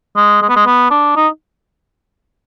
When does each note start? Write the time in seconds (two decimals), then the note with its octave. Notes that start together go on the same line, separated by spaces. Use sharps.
0.16 G#3
0.42 G#3
0.49 B3
0.56 G#3
0.66 B3
0.91 D4
1.16 D#4